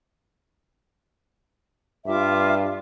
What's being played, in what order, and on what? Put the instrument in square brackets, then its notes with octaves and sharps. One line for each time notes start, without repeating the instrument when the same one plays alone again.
[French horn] G2 [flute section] F4 E5 D6